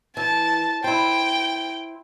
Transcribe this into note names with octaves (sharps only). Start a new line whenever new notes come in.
E3 A5
E4 C5 G5